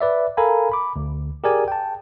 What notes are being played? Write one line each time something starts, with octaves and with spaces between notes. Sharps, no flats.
B4 D5 E5
A4 A#4 F5 G#5 A#5 B5
B5 D6
D2
G4 G#4 A#4 D5 G#5
G5 A5